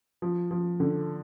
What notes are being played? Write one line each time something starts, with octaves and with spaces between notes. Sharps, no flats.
F3
F3
D3